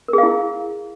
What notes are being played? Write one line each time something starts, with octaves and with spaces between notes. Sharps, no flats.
E4 G#4 A#4 F5